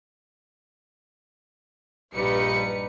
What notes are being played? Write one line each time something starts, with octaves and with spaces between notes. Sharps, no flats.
A#1 G2 G3 D#4 B4 C#7